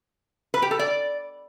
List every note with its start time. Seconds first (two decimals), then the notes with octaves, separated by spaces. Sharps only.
0.54 B4
0.62 G4
0.71 A4
0.79 D5